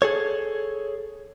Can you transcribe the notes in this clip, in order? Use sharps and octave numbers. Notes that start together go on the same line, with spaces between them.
G#4 A4 C#5